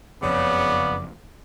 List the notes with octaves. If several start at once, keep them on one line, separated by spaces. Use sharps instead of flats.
F#1 F2 C#3 B3 D5